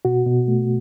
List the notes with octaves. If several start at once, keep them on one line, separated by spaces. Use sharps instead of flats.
B2 F#4
B2
A3